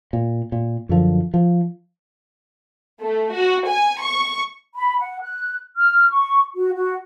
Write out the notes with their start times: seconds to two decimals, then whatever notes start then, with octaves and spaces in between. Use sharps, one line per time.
0.13 A#2
0.52 A#2
0.89 F#2 D3 F3
1.34 F3
3.01 A3
3.35 F#4
3.69 G#5
4.02 C#6
4.75 B5
4.99 F#5
5.21 F#6
5.76 F6
6.10 C#6
6.56 F#4
6.75 F#4